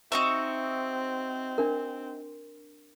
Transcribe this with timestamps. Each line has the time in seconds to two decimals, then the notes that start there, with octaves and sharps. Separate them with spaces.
0.12 C4 D#4 F#4 E5
1.58 D4 A#4